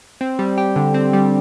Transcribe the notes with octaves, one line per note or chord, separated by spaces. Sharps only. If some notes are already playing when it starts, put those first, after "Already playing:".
C4
G3
G4
D3
C4
G3